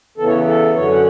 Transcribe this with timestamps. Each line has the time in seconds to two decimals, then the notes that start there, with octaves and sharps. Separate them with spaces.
0.17 E2 C#3 E3 B3 A4
0.27 C#5
0.46 A4
0.74 F#2 D3 F#3 C#4 C#5
0.91 F#5